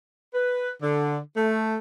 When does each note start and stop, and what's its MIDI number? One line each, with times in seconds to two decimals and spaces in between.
0.35 0.71 71
0.82 1.18 50
1.36 1.77 57